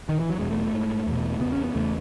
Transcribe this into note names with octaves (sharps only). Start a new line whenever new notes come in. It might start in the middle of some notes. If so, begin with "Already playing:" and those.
D#3
E3
F#3
E2 B2 G#3
A3
A3
G#2
E2 B2
E2 C#3 B3
C#4
B3
E2 C#3 A3